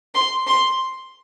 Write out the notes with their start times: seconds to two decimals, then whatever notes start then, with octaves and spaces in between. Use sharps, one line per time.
0.15 C6
0.47 C6